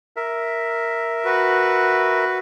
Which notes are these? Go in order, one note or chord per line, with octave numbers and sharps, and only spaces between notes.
A#4 E5
F#4 B4